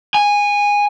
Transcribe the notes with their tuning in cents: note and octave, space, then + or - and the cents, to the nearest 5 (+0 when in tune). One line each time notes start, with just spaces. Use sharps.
G#5 -15